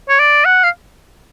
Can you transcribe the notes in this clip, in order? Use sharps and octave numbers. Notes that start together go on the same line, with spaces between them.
C#5
D5
F#5
F5